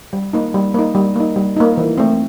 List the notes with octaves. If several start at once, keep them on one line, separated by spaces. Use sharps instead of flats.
G3
A#3 D#4
G3
A#3 D#4
G3
A#3 D#4
G3
A#3 D#4
E3
A3 C4